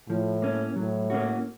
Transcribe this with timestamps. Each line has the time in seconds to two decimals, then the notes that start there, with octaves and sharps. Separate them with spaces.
0.09 A2 F3
0.42 A#3 C#4
0.76 A2 F#3
1.10 A#3 C#4 F#4